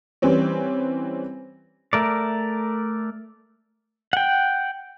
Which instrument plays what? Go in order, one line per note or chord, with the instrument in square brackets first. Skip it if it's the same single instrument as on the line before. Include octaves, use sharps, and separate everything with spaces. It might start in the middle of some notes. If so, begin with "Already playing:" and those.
[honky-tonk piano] E3 G3 C4 C#4
[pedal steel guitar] A3 A#4 D5
F#5 G5